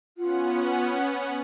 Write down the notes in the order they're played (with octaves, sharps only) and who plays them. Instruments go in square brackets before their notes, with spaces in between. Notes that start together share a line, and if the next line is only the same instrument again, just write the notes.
[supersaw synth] B3 C#4 F#5 [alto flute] F4